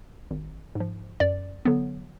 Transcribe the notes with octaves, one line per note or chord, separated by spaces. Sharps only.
G#1
G#2 F3
F#2 D5
D3 F#3 B3